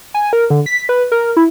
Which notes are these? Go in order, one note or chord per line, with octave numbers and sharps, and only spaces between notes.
G#5
A#4
D3
B6
B4
A#4
E4